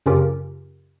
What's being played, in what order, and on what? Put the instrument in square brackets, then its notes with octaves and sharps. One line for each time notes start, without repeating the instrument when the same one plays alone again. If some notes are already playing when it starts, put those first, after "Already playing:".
[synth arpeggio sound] F#2 C#3 C#4 F4 G4 A#4